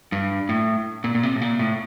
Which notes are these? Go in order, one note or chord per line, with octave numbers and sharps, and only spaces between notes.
G2
A2
A#2
A#2
C3
A2
A#2
A2